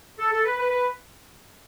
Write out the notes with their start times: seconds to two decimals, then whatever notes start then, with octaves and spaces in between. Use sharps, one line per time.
0.18 A4
0.31 A4
0.45 B4
0.58 B4
0.71 B4